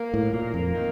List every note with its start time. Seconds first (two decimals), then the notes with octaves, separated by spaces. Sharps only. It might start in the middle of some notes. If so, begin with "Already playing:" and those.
Already playing: A#3
0.14 A2
0.33 A#2 A#3
0.54 F2
0.74 D#3